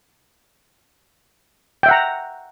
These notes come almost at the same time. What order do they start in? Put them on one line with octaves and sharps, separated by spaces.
G5 E5 F#5 A#5